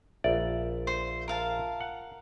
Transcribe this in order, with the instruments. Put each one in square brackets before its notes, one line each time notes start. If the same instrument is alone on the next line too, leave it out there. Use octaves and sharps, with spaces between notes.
[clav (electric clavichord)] A#1 D5 [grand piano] F4 E5
[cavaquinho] C5
A#4 F5 A5
[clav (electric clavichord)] F#5